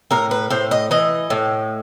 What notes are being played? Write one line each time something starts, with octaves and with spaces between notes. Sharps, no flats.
A2 A#4
B4
A2 C5
D#5
E3 D#5
A2